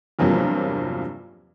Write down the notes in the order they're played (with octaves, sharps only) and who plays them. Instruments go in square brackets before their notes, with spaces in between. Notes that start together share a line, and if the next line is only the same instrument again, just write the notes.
[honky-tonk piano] E2 G2 C3 F3 F#3 A#3